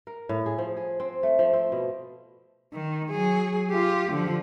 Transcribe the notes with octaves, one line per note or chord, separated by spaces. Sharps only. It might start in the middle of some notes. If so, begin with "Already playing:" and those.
A#4
A2
G#4
F3
G#4
C4
A3
F3
C4
B2
D#3
F#3 G#4
F4 G4
D3 F3